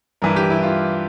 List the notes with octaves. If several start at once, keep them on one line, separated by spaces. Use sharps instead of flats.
G2 E3 A#4
G4
E4
F4